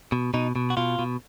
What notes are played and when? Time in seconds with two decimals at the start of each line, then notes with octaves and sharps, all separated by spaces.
0.12 B2
0.34 B2 D#4
0.56 B2
0.70 F#4
0.77 B2 F4
0.99 B2